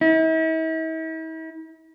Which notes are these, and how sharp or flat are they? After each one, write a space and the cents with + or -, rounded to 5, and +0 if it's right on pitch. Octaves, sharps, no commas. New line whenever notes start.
E4 -45